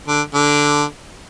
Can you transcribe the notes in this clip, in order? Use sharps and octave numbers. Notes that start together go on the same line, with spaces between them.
D3
D3